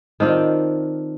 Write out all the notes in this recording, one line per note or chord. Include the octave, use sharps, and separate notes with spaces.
D#3 C4 D4 F4